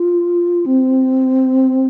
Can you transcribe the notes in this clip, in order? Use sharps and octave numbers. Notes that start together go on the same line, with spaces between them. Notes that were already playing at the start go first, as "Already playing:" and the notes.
Already playing: F4
C4